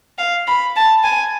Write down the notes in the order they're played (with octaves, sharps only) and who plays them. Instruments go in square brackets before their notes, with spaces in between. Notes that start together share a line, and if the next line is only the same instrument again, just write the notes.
[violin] F5
B5
A5
G#5